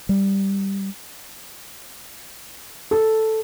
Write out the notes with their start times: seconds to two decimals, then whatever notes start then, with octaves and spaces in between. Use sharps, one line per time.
0.09 G3
2.91 A4